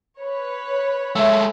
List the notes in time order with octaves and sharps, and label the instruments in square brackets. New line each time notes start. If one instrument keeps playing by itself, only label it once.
[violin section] B4 C#5
[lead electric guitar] G#3 A3 [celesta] E5 E6